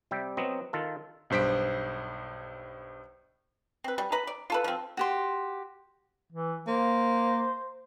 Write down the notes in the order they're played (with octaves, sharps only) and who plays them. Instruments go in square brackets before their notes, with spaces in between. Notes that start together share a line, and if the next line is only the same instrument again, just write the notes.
[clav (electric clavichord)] C3 G3 E5 G5
F#3 B3 C4 D#5
D#3 F4 A4
[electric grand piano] B1 G2 C5 B6 D7
[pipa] C4 B4
G3
B4 A#5 B5
D5
F4 A4 B4
F3 C4
[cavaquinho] F#4 G4 C6
[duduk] E3
[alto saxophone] A#3 [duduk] C5